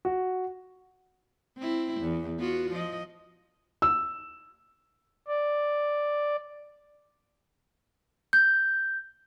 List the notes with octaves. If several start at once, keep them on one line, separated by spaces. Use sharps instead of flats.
F#4
C4 E4
E2
B3 F4 F#4
F3 D#5
E6
D5
G6